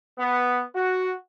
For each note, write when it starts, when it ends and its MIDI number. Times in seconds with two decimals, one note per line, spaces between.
0.18 0.63 59
0.74 1.13 66